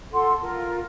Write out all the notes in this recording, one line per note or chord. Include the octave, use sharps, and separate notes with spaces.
F4 A4 F#5 C6
F4 A#4